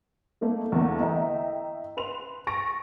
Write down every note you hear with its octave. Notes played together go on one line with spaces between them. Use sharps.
A3 A#3 D#4 A4
E2 D3 A3 A#3
E4 D#5 E5 G5 A#5
B4 C6 F7
C#6 A6 A#6 D7